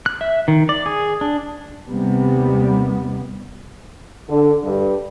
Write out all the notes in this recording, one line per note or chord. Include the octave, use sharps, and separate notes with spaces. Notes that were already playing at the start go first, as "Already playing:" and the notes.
F#6
E5
D#3
D5
G#4
D4
D#2 C3 G3 B3
D3
G2